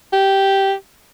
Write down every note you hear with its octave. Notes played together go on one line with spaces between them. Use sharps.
G4